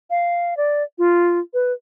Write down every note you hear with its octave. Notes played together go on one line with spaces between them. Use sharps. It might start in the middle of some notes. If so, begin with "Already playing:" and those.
F5
D5
F4
B4